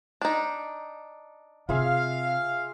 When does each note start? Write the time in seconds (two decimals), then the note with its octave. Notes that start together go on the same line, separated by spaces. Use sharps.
0.22 D4 D#4
1.69 C3 F4 G#4 E5 F5